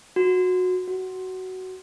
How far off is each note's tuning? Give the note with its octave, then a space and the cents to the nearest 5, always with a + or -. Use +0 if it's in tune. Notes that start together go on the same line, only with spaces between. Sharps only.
F#4 -15
F#4 +15